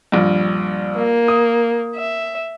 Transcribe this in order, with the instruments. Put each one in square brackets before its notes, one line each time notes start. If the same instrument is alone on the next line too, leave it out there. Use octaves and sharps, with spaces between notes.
[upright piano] A#1 G2
[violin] A#3
[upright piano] D#6
[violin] E5